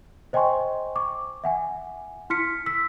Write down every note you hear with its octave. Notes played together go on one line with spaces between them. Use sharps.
C5 D#5 G5 G#5 C6 C#6
C#6 D6
E5 F#5 G#5
E4 C6 F6 B6 C#7
E6 B6